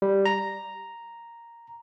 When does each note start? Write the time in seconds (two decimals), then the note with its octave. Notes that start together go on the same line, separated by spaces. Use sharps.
0.02 G3
0.26 A#5